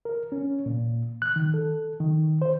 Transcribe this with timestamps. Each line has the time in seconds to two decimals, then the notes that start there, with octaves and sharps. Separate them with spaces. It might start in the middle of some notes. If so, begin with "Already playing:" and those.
0.05 A#4
0.32 C#4
0.66 A#2
1.22 F#6
1.36 D#3
1.54 A4
2.00 D#3
2.42 C5